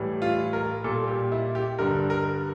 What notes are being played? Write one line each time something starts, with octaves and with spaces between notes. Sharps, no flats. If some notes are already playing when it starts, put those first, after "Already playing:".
Already playing: A2 E3 G3
F4
A#4
A#2 G3 A4
G4
E4
G4
G2 D3 G3 A#4
A#4